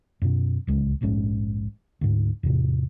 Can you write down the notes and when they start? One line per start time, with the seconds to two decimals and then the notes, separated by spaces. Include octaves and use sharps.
0.22 F#2 B2
0.67 D1 C#2 G#3
1.01 F1 A#1 G#2 C#4
2.01 D2 G#2
2.43 E2 A2 C3